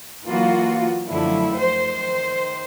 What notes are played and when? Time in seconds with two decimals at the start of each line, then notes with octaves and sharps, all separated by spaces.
0.24 E3 F#3 A#3 F4 F#4
1.09 F#2 D3 F3 F#3 A3 E4
1.54 D#3 C5